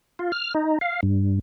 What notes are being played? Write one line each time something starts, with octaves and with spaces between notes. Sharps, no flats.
F4
F6
D#4
F5
G2